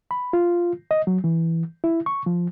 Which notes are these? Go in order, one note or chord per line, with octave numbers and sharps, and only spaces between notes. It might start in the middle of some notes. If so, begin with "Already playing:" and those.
B5
F4
D#5
F#3
E3
E4
C#6
F3